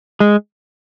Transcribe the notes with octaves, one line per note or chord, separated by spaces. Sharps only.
G#3